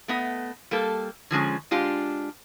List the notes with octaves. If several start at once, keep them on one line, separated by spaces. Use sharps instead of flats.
A3 B3 D#5
G3 A#3 A4
D3 F3 G#3 C#4
G#3 D4 F4 G4